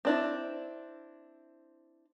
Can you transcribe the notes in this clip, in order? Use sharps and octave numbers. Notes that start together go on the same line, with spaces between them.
C4 D4 E4